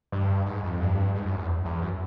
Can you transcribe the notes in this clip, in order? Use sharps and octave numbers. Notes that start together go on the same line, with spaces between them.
G2
G#2
F2
G2
G#2
F#2
E2
E2
F#2